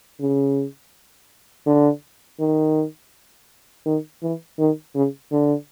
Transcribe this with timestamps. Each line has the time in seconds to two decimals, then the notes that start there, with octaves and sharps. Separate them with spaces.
0.20 C#3
1.66 D3
2.40 D#3
3.86 D#3
4.22 E3
4.59 D#3
4.95 C#3
5.32 D3